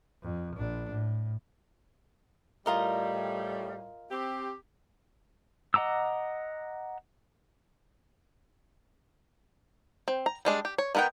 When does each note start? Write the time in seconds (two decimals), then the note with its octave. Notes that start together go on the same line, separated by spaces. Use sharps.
0.22 F2
0.56 A#1 D4
0.90 A2
2.66 A2 G3 F4 A#4 D#5
4.10 C4 G4
5.74 D#5 F#5 A#5 D6 E6
10.08 C4
10.26 A#5
10.45 G3 G#3 D4
10.65 G4
10.78 C#5
10.95 D#3 B3 A#4 F#5 G5